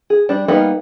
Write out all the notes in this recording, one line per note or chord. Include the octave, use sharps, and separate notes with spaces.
G#4
G3 D4
G3 A#3 B3 D#4 F4